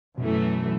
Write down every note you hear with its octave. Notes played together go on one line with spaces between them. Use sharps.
F#2 B2 E3 A3